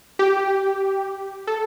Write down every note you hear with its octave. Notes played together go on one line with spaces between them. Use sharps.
G4
A4